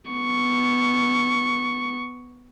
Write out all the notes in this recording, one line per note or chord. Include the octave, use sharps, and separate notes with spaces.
B3 C#6